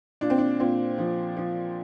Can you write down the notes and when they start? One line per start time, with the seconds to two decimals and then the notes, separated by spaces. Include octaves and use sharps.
0.21 A#2 D4
0.30 C4
0.38 D4
0.60 A#2 C4
0.98 F3
1.37 F3